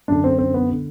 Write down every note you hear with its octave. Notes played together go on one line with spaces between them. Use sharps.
F#2 D3 D4
C4
C4
B3
D3